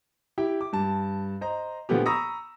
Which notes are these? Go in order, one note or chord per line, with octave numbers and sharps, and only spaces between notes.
E4 G4 G5
D6
G2 A5
C5 D#5 A#5
A#2 D3 F3 A3 B3 G4
A#5 B5 C#6 D#6 E6 A#6